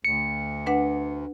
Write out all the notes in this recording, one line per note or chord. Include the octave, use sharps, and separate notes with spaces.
D2 C#7
D4 B4 F#5